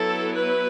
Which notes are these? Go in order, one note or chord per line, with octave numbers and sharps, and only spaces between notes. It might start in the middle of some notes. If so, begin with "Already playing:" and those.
Already playing: F#3 B3 E4 A4
B4